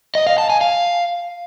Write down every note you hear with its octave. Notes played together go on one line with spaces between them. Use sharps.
D#5
F5
A5
G#5
F5